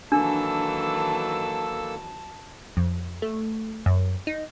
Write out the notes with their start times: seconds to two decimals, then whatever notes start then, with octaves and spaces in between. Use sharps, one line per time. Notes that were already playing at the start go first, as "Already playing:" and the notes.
0.12 D#3 E3 F#3 A#3 D4 A4 A5 E6
2.77 F2
3.22 A3
3.86 F#2
4.27 D#4